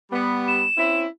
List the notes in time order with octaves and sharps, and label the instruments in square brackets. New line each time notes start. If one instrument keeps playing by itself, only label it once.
[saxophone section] G3 B3
[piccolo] E7
[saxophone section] C4 C#4 E4